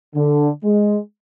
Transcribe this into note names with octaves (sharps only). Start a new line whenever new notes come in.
D3
G#3